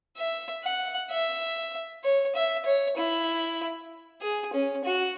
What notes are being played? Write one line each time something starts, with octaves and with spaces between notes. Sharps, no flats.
E5
F#5
E5
C#5
E5
C#5
E4
G#4
C#4
F#4